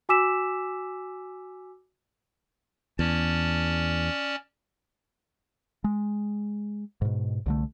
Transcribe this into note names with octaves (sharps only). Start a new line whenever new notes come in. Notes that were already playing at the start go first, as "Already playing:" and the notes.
F#4 G#5 D6 E6 B6 E7
E2 C#4 D5 A5
G#3
G#2 B2
C2 D3 A3